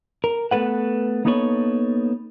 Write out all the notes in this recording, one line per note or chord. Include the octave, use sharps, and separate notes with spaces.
A#4
A3 B3 A4 B4 F#5
A#3 B3 D#4 A4 B4 C#5